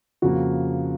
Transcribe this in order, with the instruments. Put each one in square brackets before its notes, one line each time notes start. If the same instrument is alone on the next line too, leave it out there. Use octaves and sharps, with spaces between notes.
[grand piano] F2 C#3 F3 A#3 [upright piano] F#4